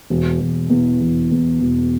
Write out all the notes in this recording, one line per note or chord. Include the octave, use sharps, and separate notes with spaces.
E1
E1
E2
E1
E2
E1